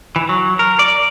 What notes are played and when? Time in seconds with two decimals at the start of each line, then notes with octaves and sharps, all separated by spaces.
0.16 E3
0.29 F#3
0.59 A#4
0.79 D5